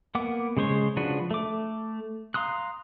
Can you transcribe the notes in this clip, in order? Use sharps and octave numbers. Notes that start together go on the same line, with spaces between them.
A#3 B3 F#5 D6
C#3 G#3 C5 C#5
C#3 F3 D4 F#4 B4
A3 D6
F5 A#5 C6 D#6 F#6